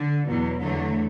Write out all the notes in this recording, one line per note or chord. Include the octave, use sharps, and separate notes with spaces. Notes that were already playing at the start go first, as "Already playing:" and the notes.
Already playing: D3
E2 B2 F#3
E2 D3 F#3 A3